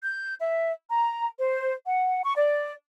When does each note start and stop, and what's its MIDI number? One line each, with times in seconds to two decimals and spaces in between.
0.04 0.34 91
0.40 0.73 76
0.90 1.26 82
1.40 1.73 72
1.85 2.22 78
2.25 2.34 85
2.37 2.73 74